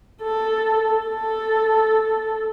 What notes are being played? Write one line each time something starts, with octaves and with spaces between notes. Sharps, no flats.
A4
A4